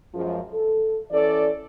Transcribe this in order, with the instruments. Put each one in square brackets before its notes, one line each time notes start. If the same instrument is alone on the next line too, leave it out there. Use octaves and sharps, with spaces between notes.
[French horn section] F#2 F3 G#3
A4
E3 C#4 A4 D5